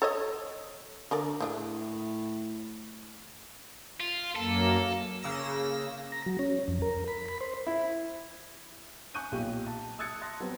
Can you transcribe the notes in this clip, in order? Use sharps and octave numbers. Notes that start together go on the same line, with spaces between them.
A4 C#5 D#5
D3 A4 A#4 D5
A2 A3 D4 G#4
F4
F#2 A#3 A4
C#3 A#3 E6 A#6
A#5
F#3
C#4
F2
A#4
B5
B5
C5
E4
G#5 C#6 F#6 G6 D#7
B1 A#2 F4 G4
A5
D#6 E6 F#6 G#6 A6 C#7
A5 C6 F#6 A6 A#6
F#3 G3 B3 C4